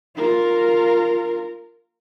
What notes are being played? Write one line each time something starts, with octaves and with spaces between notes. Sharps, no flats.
F4 A#4